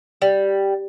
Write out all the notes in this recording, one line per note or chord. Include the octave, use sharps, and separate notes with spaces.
G3